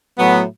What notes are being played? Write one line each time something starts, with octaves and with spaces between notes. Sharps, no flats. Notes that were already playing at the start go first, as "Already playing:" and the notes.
A2 F#3 B3